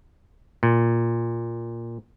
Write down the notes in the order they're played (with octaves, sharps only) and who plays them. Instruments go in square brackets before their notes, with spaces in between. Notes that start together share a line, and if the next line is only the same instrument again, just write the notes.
[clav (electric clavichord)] A#2